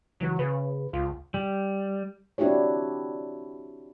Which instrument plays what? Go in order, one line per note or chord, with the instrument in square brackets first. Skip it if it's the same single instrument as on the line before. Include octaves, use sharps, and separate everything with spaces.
[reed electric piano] C#2 E3 F#4 [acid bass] F#3
[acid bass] C#3 [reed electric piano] B4
[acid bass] C#2 [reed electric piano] F4
[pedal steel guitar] G3
[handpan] C4 D4 E4 F#4 G4 C#5